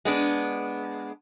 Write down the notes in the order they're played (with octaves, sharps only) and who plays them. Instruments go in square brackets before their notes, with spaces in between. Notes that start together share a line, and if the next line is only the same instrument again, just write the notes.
[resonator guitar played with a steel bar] G#3 B3 D4